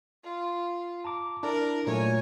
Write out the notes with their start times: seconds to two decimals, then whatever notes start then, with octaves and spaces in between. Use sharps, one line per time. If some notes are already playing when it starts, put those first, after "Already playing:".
0.24 F4
1.04 A5 A#5 D6
1.43 D4 E4 A#4 D5
1.87 A#2 F#3 A3 C#5 G#5